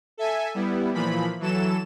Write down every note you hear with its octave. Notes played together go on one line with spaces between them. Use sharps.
A4 E5 G#5
G3 B3 E4
A#2 E3 F3 B5
E3 F#3 A4 E7